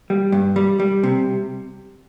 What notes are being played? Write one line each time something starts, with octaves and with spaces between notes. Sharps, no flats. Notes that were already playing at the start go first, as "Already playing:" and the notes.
G3
G2
G3
G3
C3